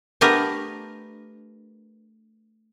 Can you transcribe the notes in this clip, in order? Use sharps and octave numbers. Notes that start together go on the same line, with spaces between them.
A3 B3 D4 G4 A#4 B4